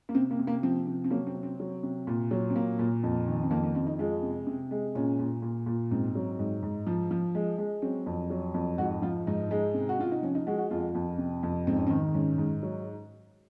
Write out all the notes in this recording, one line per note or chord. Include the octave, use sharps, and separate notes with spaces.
A#3
C3 C4
A#3
C3
A#3
F3 C4
C3
C4
F#3 A#3
C4
C3
C4
F#3
C3
A#2
F#3
C4
A#2 A#3
A#2
F2
D#3
C4
F2 A#3
A#3
F2 C4
D#4
G#3 F4
C3
C3
G#3
A#2 C#4
A#2
A#2
A#2
G#2 C4
F#3
G#2
G#2
F3
F3
G#3
G#3
F#3 C4
F2
F#3
F2
G#2 F#4
F3 F4
G#2 D#4
G#3
C3
F#4
C3 F4
D#4
F3 C#4
D#4
G#3 F#4
F#4
F2 F4
F2
C3
F2
G#2 C4
C#4
C4
D#3
G#2 C#4
G#2
F#3